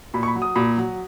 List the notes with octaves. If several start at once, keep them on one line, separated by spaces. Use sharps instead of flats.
A#2 B5
C#6
B5
F#3
D#6
A#2 B5
F#3